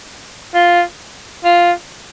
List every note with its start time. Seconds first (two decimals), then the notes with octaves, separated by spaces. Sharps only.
0.54 F4
1.45 F4